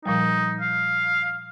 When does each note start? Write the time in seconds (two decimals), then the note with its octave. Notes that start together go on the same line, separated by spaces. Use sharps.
0.06 A#2 F3 G3 D#4
0.61 F5